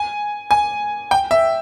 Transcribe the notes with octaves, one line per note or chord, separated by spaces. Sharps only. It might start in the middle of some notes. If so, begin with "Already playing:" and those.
Already playing: G#5
G#5
G5
E5